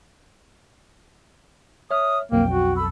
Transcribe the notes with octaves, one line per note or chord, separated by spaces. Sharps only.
C#5 E5 D#6 F6
B1 F2 A#3 G5
F#4
A4 B5 E6